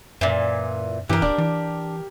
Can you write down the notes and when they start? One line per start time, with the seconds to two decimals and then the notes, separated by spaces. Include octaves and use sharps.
0.21 F#2 A#2 E3
1.09 G2 E3 G4 A#4
1.22 D#1 D4
1.38 E3